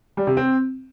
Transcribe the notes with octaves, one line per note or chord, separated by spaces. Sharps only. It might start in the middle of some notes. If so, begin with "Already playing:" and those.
G3
C3
C4